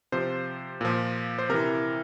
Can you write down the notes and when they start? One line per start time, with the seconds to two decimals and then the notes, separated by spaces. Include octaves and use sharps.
0.12 C3 F3 C5
0.81 A#2 F3
1.39 C5
1.49 C3 E3 A#4